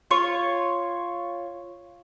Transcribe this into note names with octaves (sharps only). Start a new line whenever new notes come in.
F4 C#5 C#6